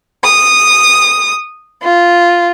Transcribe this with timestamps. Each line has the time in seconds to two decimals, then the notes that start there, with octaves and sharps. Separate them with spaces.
0.23 D#6
1.82 F4